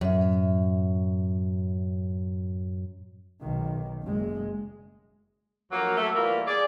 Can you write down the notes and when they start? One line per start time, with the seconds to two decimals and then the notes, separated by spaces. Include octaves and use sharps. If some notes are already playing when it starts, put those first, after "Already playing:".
0.01 F#2 A2 E5
3.41 B1 D#3
4.03 F#1 G#3
5.72 D2 F3 F#3 A#3
5.97 F#3 A3
6.15 E3 G3 A#3 B3 F4
6.47 G#4 D5